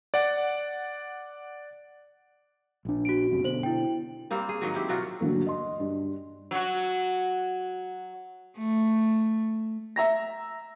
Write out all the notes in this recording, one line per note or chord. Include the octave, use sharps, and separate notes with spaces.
D5 F#5
A#1 D4
F#4 D7
F#1 F#2 C3
B2 D3 C5 F#7
E4 G5
G3 A#3 C4
G#4
G#2 D#3 F#3
C4 E4 G4
B2 F#3 F4 F#4
D2 G2 F#3 A#3
D#5 C6
G2
F#3 F#4
A3
E5 A#5 A#6